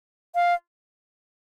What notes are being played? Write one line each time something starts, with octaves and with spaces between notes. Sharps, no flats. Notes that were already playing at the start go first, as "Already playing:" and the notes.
F5